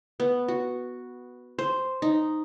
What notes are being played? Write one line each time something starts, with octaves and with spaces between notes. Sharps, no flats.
B3
F#4
C5
D#4